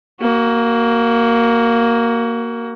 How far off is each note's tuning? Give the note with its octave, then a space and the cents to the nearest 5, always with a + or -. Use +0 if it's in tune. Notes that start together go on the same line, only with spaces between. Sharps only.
A#3 +0 F#4 +25